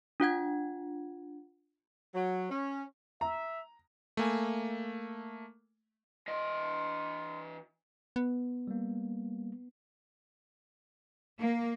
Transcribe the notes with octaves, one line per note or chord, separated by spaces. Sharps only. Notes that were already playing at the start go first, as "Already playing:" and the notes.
D4 F4 F#5 G#6
F#3
C#4
E5 A#5
A3 A#3 G#5
E3 D#5 C6
B3
G3 A#3
A#3